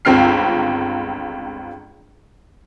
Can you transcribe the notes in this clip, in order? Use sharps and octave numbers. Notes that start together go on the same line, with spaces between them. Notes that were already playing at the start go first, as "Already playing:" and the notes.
G1 C#2 C4 G5 F6 C7